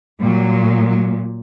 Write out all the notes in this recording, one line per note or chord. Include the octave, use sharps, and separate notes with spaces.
A#2 F#3 G3
F#3